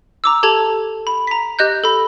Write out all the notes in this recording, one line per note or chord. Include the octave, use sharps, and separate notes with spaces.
A#5 D6 E6
G4 A4 A5 G#6 F7
B5
A#5 B6
G4 D#5 F#6 G6
A4 B5